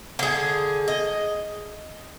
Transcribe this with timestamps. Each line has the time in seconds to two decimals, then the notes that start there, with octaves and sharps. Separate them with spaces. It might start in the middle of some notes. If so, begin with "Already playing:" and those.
0.19 D3 G#4
0.88 D#5